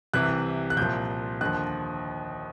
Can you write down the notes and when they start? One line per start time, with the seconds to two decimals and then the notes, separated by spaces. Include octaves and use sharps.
0.14 C2 C3 E3 F#6
0.70 F#6
0.77 C2 A#2 F3 G6
1.41 D#2 D3 F3 F#6